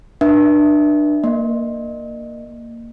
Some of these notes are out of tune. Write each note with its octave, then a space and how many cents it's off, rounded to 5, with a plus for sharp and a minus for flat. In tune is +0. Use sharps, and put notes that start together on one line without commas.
D4 +25 B4 -40 E5 +0
A#3 -5 D#5 -40